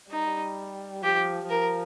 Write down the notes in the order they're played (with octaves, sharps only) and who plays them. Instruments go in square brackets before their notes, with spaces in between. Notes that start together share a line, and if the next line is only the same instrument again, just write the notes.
[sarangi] G3 [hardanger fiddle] D#4
[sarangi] F3 [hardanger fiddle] G4
[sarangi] F3 [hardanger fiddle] A#4